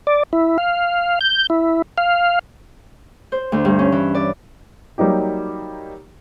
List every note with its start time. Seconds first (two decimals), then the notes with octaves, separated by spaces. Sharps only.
0.07 D5
0.33 E4
0.58 F5
1.21 G6
1.50 E4
1.98 F5
3.32 C5
3.52 D2
3.65 G2
3.79 C#4
3.92 E3
4.15 D5
4.98 F#3 G3 A#3 D#4 G4